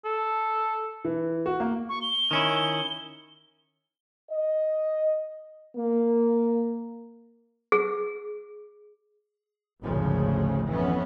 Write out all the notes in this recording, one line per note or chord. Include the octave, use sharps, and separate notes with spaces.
A4
E3
F#4
A#3
C#6
G7
D#3 C#4 E4
D#5
A#3
G#4
G#1 D2 A2 C#3 F3
F2 E3 B3 C#4